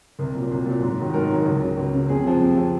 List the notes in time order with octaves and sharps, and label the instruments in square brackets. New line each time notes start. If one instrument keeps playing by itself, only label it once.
[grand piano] C2 A#4
A#2 F#3
C2
A#2 F#3
G#2
D#3 F#3
G#2 A#4
D#3 F#3
C#2
C#3 F#3
C#2
C#3 F#3
F2 G#4
C3 F3
F2
C3 F3